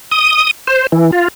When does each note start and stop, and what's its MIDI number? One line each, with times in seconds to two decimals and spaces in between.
0.11 0.51 87
0.67 0.87 72
0.92 1.11 52
1.12 1.28 65